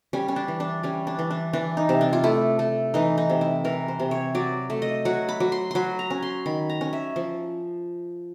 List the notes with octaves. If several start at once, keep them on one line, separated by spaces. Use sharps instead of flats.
G3 C#4
C#4
D4
E3
D4
G3 C#4
D4
E3
D4
E3 D4
D#4
C3
D4
F4
A3 E4
A3
E3 D#4
D#4
C3
E4
E3 A#4
C5
C3
C#5
F#3 D5
A3
D#5
F#3 F#5
B5
F#3
C6
F#3 B5 C6
A#5
C#4
C6
D#3 B5
A#5
C#4
E5
F3